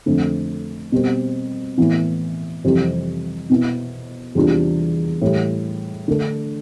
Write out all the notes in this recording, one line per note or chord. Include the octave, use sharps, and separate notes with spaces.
F2 D3 A3
B2 G3 C4
A2 E3 B3
F2 C3 E3 G3
B2 B3 E4
E2 C3 G3 D4 F4
A2 E3 G3
D3 A3 D4 A4